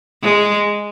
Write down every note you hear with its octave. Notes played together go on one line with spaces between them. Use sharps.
G#3